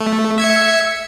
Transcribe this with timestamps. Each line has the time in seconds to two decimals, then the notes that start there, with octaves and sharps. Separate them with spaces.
0.01 A3
0.38 E5 G#6 C#7